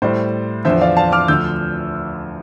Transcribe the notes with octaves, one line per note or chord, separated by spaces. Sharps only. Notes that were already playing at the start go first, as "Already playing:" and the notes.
A2 G3 C5
E2 D3 F3 C5 E5
D5 F5
F5 A5
D6 F6
D2 D3 F3 E6 G6